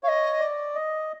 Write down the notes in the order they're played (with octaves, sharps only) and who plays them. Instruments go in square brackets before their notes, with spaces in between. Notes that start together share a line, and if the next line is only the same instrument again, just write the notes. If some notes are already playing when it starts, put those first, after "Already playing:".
[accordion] C#5 [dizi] D#5 F5
[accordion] D5
D#5